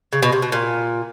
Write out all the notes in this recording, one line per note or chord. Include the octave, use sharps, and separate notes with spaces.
C#3
B2
C3
B2
A#2